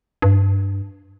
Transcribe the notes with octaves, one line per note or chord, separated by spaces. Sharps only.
G2